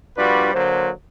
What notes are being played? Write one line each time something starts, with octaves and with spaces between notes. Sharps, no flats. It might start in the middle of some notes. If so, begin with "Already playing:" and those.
A#1 G3 D4 F4 F#4 B4
D3 F#3 A#3 C5